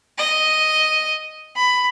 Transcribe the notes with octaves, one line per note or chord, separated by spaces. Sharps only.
D#5
B5